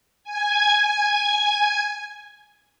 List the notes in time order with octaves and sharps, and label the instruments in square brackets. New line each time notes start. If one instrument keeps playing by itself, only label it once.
[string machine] G#5 G#6